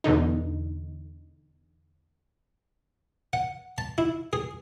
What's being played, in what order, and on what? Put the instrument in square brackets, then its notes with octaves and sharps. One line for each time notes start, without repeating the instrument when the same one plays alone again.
[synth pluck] E2 B2 D3 D#4
[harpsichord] F#5
A5
E4
G#4